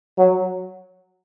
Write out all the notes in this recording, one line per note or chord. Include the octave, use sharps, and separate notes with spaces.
F#3